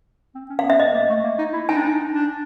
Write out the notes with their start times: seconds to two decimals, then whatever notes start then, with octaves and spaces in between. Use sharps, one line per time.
0.35 C4
0.50 C#4
0.59 F5
0.64 B3
0.70 E5
0.80 D#5
0.94 A#3
1.09 A3
1.24 A#3
1.39 D#4
1.53 E4
1.68 D#4 G#5
1.76 D4
1.83 D#4
2.13 D4